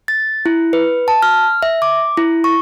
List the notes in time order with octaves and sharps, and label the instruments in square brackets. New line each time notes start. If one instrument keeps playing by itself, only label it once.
[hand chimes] A6
E4
B4
A5
F6
E5
D6
E4
C#6